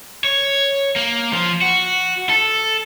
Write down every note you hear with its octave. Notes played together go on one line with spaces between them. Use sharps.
C#5
A#3
F3
F#4
A4